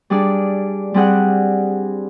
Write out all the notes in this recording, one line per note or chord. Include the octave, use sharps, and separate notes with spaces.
G3 D4 G#4 D5
G3 C4 G#4 F#5 F#6